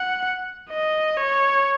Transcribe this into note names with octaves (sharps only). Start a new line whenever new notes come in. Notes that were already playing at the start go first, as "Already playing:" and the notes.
Already playing: F#5
D#5
C#5